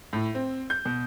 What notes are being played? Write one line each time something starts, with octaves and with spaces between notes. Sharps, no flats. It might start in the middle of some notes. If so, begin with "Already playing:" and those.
A2
C4
G6
B2